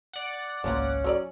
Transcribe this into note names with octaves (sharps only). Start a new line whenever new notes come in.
D5 F#5
G#1 C#2 A#3 B3 C#4 F4
F#3 A#4 D5